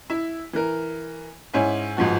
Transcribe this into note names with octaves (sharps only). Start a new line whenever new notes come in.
E4
E3 A#4
G#2 C#4 E4
G1 G#2 F3 F#4